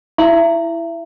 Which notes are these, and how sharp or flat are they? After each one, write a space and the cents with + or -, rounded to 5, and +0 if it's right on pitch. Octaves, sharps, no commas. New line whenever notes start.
E4 +0 E5 +30